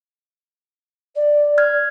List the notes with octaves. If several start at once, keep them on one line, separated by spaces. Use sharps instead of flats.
D5
F6 G#6